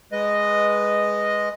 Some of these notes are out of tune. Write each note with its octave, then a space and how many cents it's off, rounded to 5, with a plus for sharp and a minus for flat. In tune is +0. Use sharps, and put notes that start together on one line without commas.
G#3 +0 B4 +0 D#5 -5